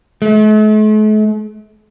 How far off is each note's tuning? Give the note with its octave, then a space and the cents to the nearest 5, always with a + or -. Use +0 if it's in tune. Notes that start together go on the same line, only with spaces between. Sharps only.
A3 -45